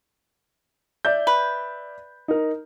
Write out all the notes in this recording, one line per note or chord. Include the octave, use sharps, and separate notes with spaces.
D5 E5 G6
B4
D#4 A#4